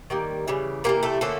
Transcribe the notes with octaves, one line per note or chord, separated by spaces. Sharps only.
D#3 G3 A#3
C#3 E3 G3
C3 E3 G3 A#3 A#4
A3 A4
D3 F3 A3 A#3 C#4 A4